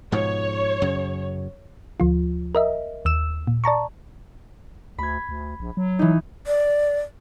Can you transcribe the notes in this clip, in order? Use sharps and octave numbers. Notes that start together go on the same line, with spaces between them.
G#2 B2 F3 C#5
F#2 C#3
D2 F3 F4
A#4 D#5 E5
D#2 E6 E7
A#2
D5 A5 A#5 C#6
D2 B5 G#6
D2
A#1
F#3
E3 D#4
D5